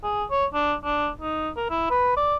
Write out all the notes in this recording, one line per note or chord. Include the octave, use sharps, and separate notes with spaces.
G#4
C#5
D4
D4
D#4
A#4
E4
B4
D5